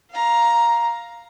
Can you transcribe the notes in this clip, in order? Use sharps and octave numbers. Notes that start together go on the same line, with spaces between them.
F5 A#5